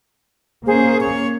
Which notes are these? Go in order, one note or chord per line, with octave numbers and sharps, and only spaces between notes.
A#3 C#4 G#4 C5
C#5 C#6